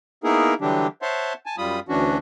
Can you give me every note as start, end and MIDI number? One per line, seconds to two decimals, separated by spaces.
0.24 0.54 58
0.24 0.54 59
0.24 0.54 63
0.24 0.54 64
0.24 0.54 68
0.24 0.54 70
0.61 0.87 50
0.61 0.87 52
0.61 0.87 54
0.61 0.87 55
0.61 0.87 62
0.61 0.87 67
1.02 1.33 72
1.02 1.33 73
1.02 1.33 76
1.02 1.33 78
1.02 1.33 81
1.02 1.33 84
1.46 1.56 80
1.46 1.56 81
1.58 1.80 42
1.58 1.80 55
1.58 1.80 65
1.58 1.80 83
1.58 1.80 87
1.89 2.18 38
1.89 2.18 52
1.89 2.18 61
1.89 2.18 62
1.89 2.18 66